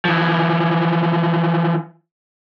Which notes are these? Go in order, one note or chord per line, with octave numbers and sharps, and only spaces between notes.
E3 F3